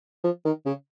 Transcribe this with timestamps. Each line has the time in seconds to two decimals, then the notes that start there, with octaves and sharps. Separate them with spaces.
0.24 F3
0.45 D#3
0.66 C#3